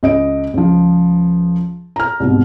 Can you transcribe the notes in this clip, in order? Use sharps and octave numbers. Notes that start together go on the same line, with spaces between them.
C#2 D#5 D7
C#2 F3
A#5 F6
C2 G#2 B2